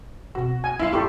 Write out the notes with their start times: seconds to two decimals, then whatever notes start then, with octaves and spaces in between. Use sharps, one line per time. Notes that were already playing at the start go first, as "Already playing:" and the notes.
0.35 B2 C4 F#4
0.64 C4 G#5
0.79 F#3 B3 E4 F4 C7
0.93 G1 E4 G4 A4 E5 C6 C#6